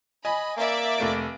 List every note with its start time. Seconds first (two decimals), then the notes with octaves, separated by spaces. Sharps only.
0.25 D#5 G#5 B5
0.57 A#3 D5 E5 D6
0.98 F1 A3 D7